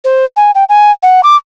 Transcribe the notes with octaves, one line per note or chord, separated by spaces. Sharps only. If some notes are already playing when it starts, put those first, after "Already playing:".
C5
G#5
G5
G#5
F#5
D6